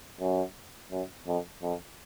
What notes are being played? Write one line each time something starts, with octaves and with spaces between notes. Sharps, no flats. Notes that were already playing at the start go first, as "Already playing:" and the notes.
F#2
F#2
F2
F2